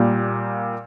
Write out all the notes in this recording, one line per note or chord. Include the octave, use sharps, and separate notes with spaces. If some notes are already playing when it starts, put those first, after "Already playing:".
Already playing: A#2 G3 A#3